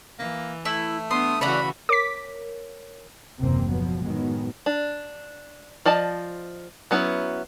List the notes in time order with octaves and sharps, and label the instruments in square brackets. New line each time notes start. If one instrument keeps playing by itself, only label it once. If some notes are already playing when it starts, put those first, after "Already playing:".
[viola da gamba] E3 [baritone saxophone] A#3
[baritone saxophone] A3 [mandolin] E4
[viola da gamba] B3 D4 [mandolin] C6 [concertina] D#6
[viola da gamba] C#3 E3 F#4 [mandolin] C#5 D5 F#5 [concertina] B5
[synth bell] A#4 C#5 [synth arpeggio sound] D6 B6
[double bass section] F#1 D#2 C3 E3 A#3 C4
B2 F3 F#3 B3
A2 D#3 F#3 G#3 B3
[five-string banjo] D4
F3 D5 D#5 A5
F#3 B3 C#4 E4